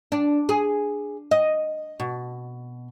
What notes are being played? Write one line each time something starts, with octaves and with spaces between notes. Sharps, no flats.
D4
G#4
D#5
B2